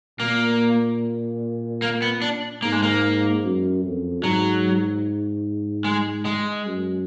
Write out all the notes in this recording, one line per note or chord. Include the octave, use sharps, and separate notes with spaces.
A#2 A#3
A#3
B3
D4
G#2 A#3
G#3
A#3
F#2
F2
G#2 F#3
G#3
G#3
F#2